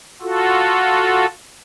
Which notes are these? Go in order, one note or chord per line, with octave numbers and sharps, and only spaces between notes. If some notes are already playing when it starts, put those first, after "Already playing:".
F4 F#4 A4